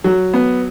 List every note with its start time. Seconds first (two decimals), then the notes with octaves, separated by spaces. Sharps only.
0.04 F#3
0.34 B3